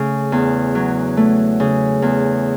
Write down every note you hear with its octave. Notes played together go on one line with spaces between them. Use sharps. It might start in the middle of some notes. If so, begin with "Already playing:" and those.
Already playing: C#3 A3
E2
F#3
A3
C#3
E2